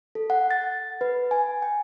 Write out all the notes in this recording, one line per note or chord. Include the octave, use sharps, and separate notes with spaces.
A4
F#5
A6
B4
G#5
G5